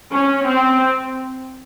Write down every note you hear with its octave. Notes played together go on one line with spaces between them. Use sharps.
C#4
C4